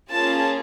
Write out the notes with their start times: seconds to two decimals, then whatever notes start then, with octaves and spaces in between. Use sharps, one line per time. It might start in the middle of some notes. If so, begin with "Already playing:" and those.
0.12 A#3 C#4 F4 G#4 A5